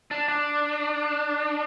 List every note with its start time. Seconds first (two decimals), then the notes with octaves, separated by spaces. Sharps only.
0.11 D4
0.28 D4